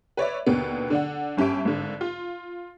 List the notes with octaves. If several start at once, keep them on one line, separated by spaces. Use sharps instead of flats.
B4 C#5 D5 E5
D#2 B2 D3 B3
D3 D4 F#5
G1 C#4 G4 E5 D7
G#1 D3
F4